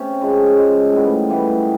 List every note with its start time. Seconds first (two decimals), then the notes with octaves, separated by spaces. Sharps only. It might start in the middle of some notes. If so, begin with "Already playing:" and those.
Already playing: C3 C#4
0.22 C#3 F3 G#3
0.57 C#3 F3 G#3
0.92 A2 E3 G3 B3
1.29 A2 E3 G3 B3